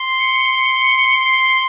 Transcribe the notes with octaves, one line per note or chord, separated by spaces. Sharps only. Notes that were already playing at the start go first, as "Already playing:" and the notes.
Already playing: C6
C#7
C#7
C7